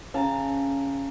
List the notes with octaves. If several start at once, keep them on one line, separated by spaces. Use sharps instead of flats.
C#3 A5 A#5